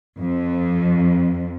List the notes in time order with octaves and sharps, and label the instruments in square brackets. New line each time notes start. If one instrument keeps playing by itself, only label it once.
[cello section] F2